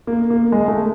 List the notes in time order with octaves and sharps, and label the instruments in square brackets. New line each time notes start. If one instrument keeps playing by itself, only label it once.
[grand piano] A#3
A#3
G#3
A3